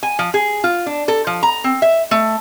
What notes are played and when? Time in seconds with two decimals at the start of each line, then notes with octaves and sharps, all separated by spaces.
0.03 G#5
0.19 F3
0.34 G#4
0.64 F4
0.86 D4
1.08 A4
1.27 F3
1.43 A#5
1.64 C4
1.82 E5
2.11 A3